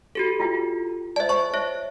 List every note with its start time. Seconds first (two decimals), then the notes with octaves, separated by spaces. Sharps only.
0.15 F#4 G4 A4
0.40 E4 F4 G5
1.16 C5 D5 E5 A5
1.29 C5 C#5 A5 C#6
1.54 C#5 E5